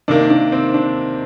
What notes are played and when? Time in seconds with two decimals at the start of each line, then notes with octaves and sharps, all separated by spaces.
0.08 C3 D#3 A#3 D4
0.30 D4
0.52 C4
0.74 D4